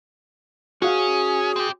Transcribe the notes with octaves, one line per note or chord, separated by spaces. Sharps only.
C#4 F#4 G#4 F5
C4 G4